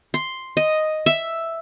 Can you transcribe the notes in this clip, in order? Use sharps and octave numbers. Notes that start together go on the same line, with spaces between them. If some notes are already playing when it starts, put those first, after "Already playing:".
C6
D#5
E5